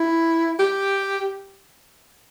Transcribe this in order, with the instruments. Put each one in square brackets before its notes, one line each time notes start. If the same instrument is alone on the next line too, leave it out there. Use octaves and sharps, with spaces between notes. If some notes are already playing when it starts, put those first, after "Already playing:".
Already playing: [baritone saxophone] E4
G4